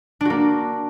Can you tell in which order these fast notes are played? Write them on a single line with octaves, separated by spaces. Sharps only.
D4 F#4 A#3